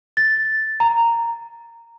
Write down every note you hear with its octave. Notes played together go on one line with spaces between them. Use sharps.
A6
A#5